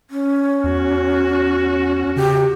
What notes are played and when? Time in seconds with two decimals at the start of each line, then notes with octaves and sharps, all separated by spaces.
0.10 C#4
0.64 E2 F#4
2.16 C#3 G4